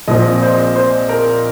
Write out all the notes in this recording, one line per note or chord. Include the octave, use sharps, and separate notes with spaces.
A#1 A#2 F3 C4 D#5
C5
C5
A#4